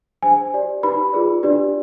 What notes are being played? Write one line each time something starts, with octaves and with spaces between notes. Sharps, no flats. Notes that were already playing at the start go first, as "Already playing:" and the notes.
D4 G#4 C5 G#5
G4 D5
D#4 G4 B4 B5
F4 G#4 B4 D5
D4 G4 B4 D5